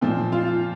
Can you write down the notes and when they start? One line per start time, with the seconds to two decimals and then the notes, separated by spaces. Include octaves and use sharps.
0.01 A#2 F3 C4
0.32 F4